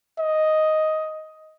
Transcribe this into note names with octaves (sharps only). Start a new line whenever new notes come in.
D#5